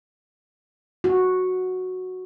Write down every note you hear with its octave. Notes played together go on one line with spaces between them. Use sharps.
F#4